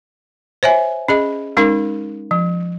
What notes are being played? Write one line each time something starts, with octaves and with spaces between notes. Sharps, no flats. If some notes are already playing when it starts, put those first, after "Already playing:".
C5 C#5 E5 G#5
C#4 G#4 D#5
G#3 C#4 D#4 A#4
F3